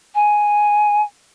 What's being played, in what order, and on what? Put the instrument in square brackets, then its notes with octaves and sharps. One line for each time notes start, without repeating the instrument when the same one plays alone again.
[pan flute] G#5